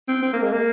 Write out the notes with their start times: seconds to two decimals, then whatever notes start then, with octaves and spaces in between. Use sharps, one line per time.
0.08 C4
0.22 C4
0.33 A#3
0.43 G#3
0.52 A#3